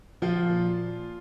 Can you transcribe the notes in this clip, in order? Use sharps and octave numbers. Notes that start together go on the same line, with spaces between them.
F3 F4
A#2